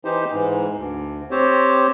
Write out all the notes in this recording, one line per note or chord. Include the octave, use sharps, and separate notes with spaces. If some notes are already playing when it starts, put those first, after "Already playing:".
E3 D#4 G4 C5
G#2 E3
D2
C4 G4 C5 C#5